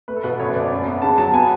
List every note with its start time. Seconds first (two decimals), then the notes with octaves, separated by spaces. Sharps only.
0.08 A3 B4
0.16 A4
0.23 B2 B4
0.40 F#1 C#5
0.55 F#1 D5
0.72 F#2
0.87 B3
1.02 C#3 A5
1.18 F#3 A5
1.33 B3 G#5